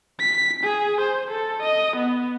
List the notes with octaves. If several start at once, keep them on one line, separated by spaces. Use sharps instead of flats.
B6
G#4
C5
A4
D#5
B3